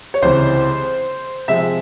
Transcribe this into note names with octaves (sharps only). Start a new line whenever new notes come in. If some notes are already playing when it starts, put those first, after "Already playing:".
C#5
C#2 C3 E3 C5
C3 F3 G#3 C4 E5